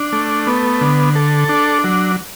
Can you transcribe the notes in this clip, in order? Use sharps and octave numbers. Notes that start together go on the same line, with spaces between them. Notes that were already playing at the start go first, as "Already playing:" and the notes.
Already playing: D4
A3
B3
D3
A4
D4
F#3